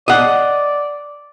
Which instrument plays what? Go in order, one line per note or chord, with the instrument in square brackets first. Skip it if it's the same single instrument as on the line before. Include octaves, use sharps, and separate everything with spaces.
[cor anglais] D5 [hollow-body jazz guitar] D#5 F#5